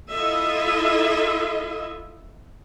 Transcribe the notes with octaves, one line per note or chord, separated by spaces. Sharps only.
E4 F4 A4 D#5 E5